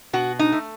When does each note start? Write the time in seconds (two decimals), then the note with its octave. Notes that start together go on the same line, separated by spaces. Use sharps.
0.13 B2 F#4
0.39 D#4
0.52 A3